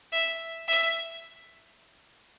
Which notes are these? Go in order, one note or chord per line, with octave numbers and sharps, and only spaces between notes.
E5
E5